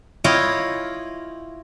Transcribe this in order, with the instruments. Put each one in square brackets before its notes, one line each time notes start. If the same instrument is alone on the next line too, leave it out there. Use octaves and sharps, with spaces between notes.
[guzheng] E4 F4 C#5 D#5 G5